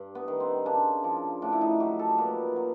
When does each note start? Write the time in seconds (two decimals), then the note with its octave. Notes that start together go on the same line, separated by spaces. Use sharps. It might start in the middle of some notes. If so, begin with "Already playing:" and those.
Already playing: G2
0.15 B3
0.28 D#3
0.40 C4
0.66 C#3 D4
1.04 F3 D4
1.42 A2 D4
1.53 E4
1.61 D#4
1.80 F#3 G4
1.99 A4
2.18 A#2 B4
2.56 F#3